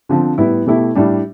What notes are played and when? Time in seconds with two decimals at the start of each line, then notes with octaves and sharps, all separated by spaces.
0.09 D3 F3 C4
0.38 A2 G3 B3 E4
0.66 B2 A3 E4 G4
0.95 A2 G3 D4